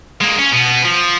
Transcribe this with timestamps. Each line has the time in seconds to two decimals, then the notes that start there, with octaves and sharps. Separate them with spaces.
0.21 G#3 A#3
0.39 C#4
0.53 B2 B3
0.85 F3